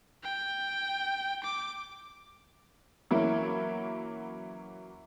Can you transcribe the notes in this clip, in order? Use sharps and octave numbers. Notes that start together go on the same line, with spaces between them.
G5
D6
E3 F#3 A#3 C#4 E4